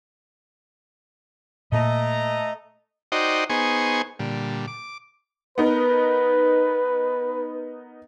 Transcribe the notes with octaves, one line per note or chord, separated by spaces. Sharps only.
A#2 A3 A#3 D#5 A#5
D#4 F#4 C5 D5 D#5 G5
B3 D#4 G#4 C5 G#5 C#6
A#2 D3 G3
D6
B3 D#4 A#4 B4